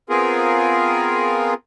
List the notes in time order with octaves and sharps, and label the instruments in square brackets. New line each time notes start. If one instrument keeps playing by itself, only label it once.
[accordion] B3 C4 F4 G#4 A#4